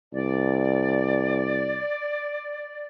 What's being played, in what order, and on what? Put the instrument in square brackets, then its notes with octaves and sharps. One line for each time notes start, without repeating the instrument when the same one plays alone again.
[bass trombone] C2 [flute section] D5